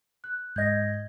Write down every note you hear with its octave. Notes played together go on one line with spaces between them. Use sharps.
F#6
G#2 D#5 G6 G#6 A#6